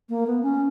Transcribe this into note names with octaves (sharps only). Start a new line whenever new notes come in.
A#3
B3
C#4